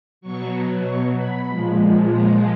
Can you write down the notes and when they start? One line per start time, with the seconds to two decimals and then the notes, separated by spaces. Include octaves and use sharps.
0.21 B2 F#3 C#6
0.84 C#6
1.15 B5
1.47 A#2 F3 G#3
2.10 A#5